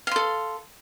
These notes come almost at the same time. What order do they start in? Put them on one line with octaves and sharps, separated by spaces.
F5 C6 A4